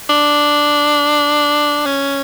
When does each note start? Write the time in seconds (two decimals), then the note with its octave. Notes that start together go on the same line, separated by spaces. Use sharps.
0.09 D4
1.86 C#4